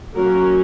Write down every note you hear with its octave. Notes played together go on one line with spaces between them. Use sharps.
F#3 A#3 C#4 F#4 A#4